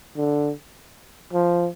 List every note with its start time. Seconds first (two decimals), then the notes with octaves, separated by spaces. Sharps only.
0.17 D3
1.33 F3